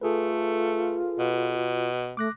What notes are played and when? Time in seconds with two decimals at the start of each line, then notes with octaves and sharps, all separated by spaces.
0.01 A3 F4 G#4 A4 B4
1.19 B2
2.17 A3 D6 F#6 A#6